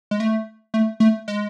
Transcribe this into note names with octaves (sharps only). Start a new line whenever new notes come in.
G#3
A3
A3
A3
G#3